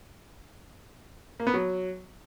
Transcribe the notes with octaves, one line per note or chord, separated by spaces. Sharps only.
A#3
B3
F#3